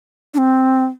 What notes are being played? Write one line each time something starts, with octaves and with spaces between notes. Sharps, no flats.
D4
C4